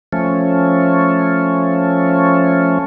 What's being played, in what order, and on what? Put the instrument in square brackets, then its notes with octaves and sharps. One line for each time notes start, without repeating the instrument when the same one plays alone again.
[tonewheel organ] F3 A3 C#4